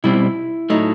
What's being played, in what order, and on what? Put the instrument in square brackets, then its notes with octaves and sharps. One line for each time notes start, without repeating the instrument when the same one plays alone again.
[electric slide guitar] B2 G3 C4 [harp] E4
[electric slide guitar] A2 F#3 A3 [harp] D#4